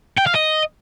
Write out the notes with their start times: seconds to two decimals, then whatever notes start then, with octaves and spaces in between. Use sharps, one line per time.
0.17 G5
0.26 F5
0.35 D#5